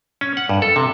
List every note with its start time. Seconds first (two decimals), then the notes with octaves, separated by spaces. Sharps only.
0.21 C#4
0.37 F#5
0.49 G2
0.62 A4
0.76 C3